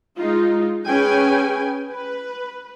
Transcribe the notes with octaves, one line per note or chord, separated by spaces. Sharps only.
G#3 D#4 F4
C#4 G#4 B4 G5 G#5
B4